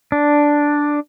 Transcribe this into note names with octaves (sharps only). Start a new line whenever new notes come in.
D4